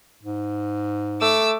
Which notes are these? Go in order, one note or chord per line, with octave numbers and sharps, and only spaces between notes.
G#2
A3 D6 E6